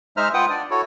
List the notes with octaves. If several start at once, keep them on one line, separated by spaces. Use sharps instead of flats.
G#3 D#4 C5 E5 A#5 F6
F4 B4 F#5 G5 D#6
D4 D5
E4 F#4 A4 C#5